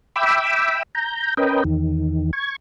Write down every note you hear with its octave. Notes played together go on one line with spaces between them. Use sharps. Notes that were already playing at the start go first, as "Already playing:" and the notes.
E5 G5 B5 D6 E6
A#5 G6
C#4 A#4 B4 D#5 G5
E2 D#3
C#6 G#6